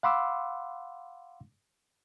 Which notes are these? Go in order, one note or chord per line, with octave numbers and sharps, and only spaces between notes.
F5 F#5 B5 C6 D6 E6